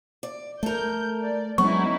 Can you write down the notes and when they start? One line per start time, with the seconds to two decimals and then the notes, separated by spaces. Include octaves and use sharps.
0.23 D5
0.63 A3 A4 A#4 G6
1.23 D5
1.58 F#3 G#3 B3 C#4 D#4 E4 C#6